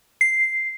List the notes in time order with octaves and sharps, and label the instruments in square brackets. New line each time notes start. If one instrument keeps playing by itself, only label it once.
[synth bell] C7